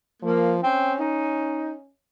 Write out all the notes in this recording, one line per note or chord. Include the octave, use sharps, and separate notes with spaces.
F3 A#3
C4 C#4
D#4